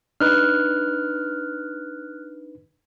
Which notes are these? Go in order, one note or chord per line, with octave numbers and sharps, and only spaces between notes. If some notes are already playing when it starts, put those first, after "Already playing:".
D4 D#4 B4 F6 F#6